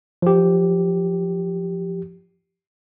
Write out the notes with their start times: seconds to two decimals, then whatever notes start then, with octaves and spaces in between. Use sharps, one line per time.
0.22 F3 G4